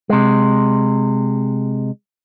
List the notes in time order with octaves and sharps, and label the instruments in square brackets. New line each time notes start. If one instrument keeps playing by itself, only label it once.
[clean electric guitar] C3 G#3